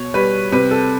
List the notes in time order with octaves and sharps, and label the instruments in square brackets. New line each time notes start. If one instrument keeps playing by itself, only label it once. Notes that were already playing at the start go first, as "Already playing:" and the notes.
Already playing: [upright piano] B2 C#5
G3 B4
C3 B4
A4